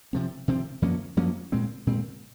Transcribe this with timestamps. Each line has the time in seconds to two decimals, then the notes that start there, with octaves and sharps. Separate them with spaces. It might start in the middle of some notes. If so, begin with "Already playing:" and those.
0.13 C3 F3 C4
0.48 C3 F3 C4
0.82 F#2 F3 A#3 C#4
1.17 F#2 F3 A#3 C#4
1.52 A#2 G#3 C4
1.87 A#2 G#3 C4